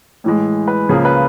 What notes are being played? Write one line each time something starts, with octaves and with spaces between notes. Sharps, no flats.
A2 E3 G#3
B4
C#2 C#3 F3 A#3 G#4
B4